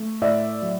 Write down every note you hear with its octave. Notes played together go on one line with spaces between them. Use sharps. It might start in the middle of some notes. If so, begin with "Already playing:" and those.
Already playing: A3
A2 D5 E5
F#3